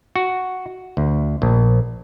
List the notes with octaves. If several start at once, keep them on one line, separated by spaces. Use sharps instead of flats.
F#4
D2
A#1